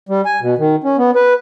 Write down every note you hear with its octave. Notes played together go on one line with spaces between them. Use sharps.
G3
G#5
B2
D#3
C#4
B3
B4